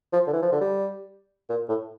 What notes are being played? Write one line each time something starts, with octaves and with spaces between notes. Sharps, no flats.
F3
D3
E3
F3
D3
G3
A#2
A2